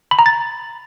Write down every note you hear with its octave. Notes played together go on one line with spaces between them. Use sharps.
B5
A#5
A6